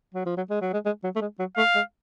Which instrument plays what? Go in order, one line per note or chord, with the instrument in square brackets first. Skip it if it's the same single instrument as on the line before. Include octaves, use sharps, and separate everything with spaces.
[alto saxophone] F#3
F3
F#3
G#3
F#3
G#3
G#3
F#3
A3
G#3
F#3
[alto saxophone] A3 [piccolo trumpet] F5
[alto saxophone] G#3